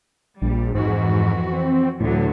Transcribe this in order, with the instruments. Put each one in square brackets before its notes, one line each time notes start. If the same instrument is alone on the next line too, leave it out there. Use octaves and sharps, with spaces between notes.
[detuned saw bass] A#1 [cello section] G3
[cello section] F2 E3 F#4 [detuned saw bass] G#2
[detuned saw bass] C4
[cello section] D2 D3 F#3 [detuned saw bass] A2